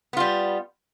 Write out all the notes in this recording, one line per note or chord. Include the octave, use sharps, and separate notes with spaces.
G3 B3 F4